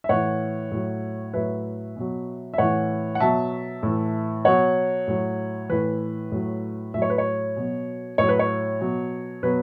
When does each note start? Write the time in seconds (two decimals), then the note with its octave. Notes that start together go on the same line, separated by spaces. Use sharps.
0.04 E5
0.09 A2 E3 C#5 F#5
0.71 A2 F#3
1.33 A2 F#3 B4 E5
1.96 B2 F#3
2.54 E5
2.58 A2 E3 C#5 F#5
3.15 F#5
3.20 B2 F#3 E5 A5
3.83 A2 E3
4.45 B2 F#3 C#5 F#5
5.08 A2 F#3
5.69 A2 E3 B4
6.32 A2 F#3
6.94 A2 E5
6.98 F#3 C#5
7.10 B4
7.18 C#5
7.56 B2 F#3
8.18 A2 F#3 C#5
8.29 B4
8.39 C#5
8.81 B2 F#3
9.43 B2 F#3 B4